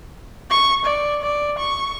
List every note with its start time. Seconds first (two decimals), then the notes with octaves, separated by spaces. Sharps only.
0.51 C#6
0.85 D5
1.23 D5
1.59 C#6